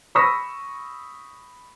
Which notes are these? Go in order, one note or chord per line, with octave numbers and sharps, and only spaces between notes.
B5 C#6 D#6 E6 A#6 B6